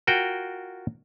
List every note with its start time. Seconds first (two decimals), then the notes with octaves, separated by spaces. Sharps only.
0.07 F4 F#4 A#4 G5